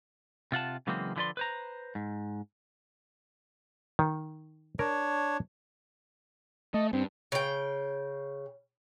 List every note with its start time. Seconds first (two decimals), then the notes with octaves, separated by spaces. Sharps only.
0.52 C3 F4 F#5 A5
0.87 C#3 E3 F#3 G#3 A#3 C4
1.16 D3 F3 E4 B4 D5 C6
1.37 B4 C5 A#5
1.95 G#2
3.99 D#3
4.79 D4 A#4 C#5
6.74 A3 D#5
6.93 G2 C4
7.32 C#3 G5